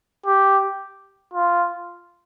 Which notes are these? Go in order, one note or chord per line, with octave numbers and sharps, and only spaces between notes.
G4
F4